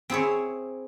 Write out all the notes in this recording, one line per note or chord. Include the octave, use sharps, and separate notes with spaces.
C4 E4 G#4 C#5